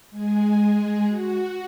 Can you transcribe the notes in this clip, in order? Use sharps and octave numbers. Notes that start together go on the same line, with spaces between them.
G#3 G#4
F#4